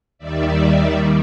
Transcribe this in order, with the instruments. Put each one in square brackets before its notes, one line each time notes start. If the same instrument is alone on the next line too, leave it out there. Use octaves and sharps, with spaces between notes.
[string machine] D#2 D#3 G3 D5 E5